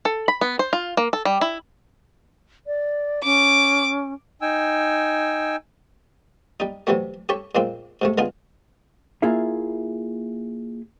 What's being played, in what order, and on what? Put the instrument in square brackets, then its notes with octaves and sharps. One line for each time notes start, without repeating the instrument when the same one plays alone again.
[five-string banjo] A4
B5
B3
C5
F4
A#3
A4
G3
E4
[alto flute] D5
[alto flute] C#4 [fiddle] D6
[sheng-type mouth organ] D#4 G5 G#5 E6
[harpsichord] G3 D#4
C3 E3 F#3 G3 A3
G4 A4 C#5 E5
A#2 G#3 A#3 C4
G#2 C3 A3
D3 G#3 B3 D#4 F4 G#4
[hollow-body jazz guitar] A#3 E4 F4 G#4 E5